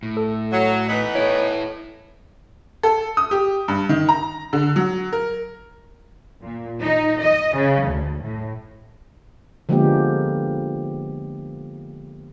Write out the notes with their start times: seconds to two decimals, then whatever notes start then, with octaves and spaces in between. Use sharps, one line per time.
0.03 A2
0.17 A4
0.52 F#3
0.88 E3 B3 D#4 B6
1.15 E4 A4 C#5
2.83 A4
3.17 D#6
3.31 G4
3.68 G2
3.89 D#3
4.09 A#5
4.53 D3
4.76 F#3
5.13 A#4
6.43 A#2
6.80 D#4
7.20 D#5
7.55 C#3
7.88 D2
8.23 A2
9.69 D3 F3 G#3 A#3 B3 G4